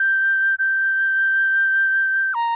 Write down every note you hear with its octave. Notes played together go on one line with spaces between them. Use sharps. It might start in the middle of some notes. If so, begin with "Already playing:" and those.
Already playing: G6
G6
A#5